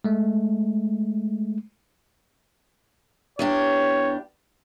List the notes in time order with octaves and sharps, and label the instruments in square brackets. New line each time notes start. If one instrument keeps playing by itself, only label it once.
[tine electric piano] G#3 A3
[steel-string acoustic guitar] E2 D4 G4 [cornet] C#5